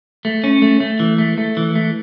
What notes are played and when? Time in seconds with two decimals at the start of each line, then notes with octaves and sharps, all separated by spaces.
0.25 A3
0.44 C#4
0.62 A3
0.80 A3
1.00 E3
1.18 A3
1.38 A3
1.57 E3
1.75 A3